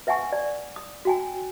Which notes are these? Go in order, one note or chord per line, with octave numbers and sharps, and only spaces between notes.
B4 E5 F#5 G#5 C#6
D5
D#6
F#4 G5 G#5